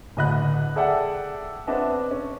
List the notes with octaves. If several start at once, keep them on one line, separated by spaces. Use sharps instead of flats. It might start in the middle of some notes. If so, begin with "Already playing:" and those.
D1 D2 D#5 B5 F#6
G#4 A4 D5 E5 F#5 G5
B3 C4 D4 D#5 E5 A5
C#4